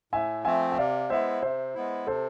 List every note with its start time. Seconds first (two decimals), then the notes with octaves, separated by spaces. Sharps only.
0.13 A2 E5 G#5
0.45 F3 A3 C4 E5 G#5
0.72 E5
0.78 C3 D5 F5
1.10 G#3 B3 E4 C5 E5
1.42 C3 C5 E5
1.75 G#3 B3 E4
2.07 C3 A4 C5